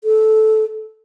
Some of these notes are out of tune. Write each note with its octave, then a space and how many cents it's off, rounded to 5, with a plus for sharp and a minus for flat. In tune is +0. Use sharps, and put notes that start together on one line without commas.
A4 -15